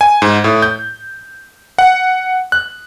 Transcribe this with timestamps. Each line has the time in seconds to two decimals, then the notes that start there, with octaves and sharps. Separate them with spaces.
0.01 G#5
0.22 G#2
0.44 A2
0.62 G6
1.78 F#5
2.52 F#6